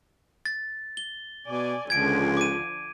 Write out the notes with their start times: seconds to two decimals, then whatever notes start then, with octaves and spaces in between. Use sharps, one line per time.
0.46 A6
0.97 G7
1.48 B2 D5 G#5
1.90 C#2 D3 F3 G#5 G#6 D7
2.37 D6 D#7